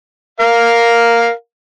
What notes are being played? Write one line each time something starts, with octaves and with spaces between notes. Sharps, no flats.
A#4 F5